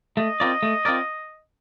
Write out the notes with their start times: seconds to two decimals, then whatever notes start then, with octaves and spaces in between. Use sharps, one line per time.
0.17 A3 D#5
0.40 C4 F4 A#4 D5
0.63 A3
0.85 C4 F4 A#4 D5